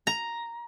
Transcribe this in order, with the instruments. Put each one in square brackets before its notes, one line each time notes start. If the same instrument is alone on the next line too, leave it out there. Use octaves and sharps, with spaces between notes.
[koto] A#5